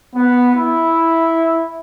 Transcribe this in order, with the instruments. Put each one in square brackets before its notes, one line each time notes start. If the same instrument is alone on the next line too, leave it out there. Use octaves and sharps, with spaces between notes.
[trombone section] B3
E4